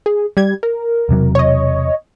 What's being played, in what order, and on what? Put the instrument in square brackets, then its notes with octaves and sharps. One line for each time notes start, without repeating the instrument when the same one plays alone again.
[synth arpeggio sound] G#4
G3 G#6
A#4
[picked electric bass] E1 C3 F#3
[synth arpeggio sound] C#5 D#5